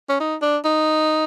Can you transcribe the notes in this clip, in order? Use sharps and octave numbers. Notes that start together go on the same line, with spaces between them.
C#4
D#4
D4
D#4